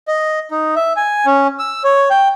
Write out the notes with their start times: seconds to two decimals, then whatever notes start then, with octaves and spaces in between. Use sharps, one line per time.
0.08 D#5
0.51 D#4
0.76 E5
0.97 G#5
1.26 C#4
1.59 E6
1.84 C#5
2.10 G5